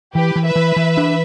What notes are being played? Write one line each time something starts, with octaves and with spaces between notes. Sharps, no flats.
E3 G4 B4
E3
B4 E5
E3
E3
D4